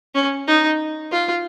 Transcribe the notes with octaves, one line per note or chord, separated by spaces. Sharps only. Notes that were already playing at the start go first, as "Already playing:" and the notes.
C#4
D#4
F4